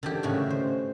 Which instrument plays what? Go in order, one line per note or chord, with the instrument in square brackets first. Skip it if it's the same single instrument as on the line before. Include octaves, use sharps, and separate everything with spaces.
[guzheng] D3 D#3 G4
A2 C#3 F#4
C5